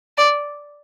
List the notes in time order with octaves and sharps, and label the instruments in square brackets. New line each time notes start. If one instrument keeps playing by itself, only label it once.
[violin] D5